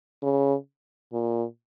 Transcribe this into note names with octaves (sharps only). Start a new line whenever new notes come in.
C#3
A#2